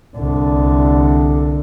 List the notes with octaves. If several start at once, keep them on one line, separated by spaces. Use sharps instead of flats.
C2 D3